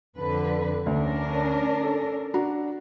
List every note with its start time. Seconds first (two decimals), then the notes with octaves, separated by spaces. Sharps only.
0.18 F2 D3 B4
0.86 D2 C#4 D4 A#4
1.83 A4
2.34 D4 F#4 A#5